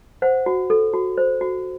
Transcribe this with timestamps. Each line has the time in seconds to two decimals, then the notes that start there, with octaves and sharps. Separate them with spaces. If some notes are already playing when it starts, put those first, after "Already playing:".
0.22 C5 F#5
0.46 F#4
0.70 A4
0.94 F#4
1.17 C5
1.41 F#4